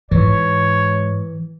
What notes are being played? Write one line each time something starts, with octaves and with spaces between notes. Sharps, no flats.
G#2 E3 C#5